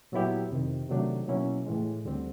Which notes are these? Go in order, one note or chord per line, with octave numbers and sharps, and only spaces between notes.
A#2 F#3 B3 E4 G4
F2 C3 D#3
C3 D#3 F#3 A3 D4
B2 F#3 A#3 C#4 E4
A2 E3 G#3
D2 D3 G3 C4